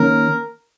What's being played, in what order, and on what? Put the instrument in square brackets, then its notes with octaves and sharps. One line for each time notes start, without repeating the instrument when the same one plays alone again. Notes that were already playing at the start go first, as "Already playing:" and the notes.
Already playing: [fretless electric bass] D#3 A#3 C#4 [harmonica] A#4